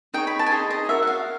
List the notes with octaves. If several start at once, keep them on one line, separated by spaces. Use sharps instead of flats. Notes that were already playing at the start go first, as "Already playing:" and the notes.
D#4 G#4 C#5 G5
B5
A5
G#5
D#4 G#4 C5 D#5 A5
D#5
F#4 A#4 C#5 E5
F#5
F5